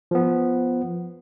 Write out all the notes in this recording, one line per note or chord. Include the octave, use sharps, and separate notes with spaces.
F3 B3